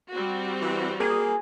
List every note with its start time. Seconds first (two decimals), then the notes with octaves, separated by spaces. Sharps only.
0.11 G3 C4 F#4
0.62 E3
1.00 A#3 G#4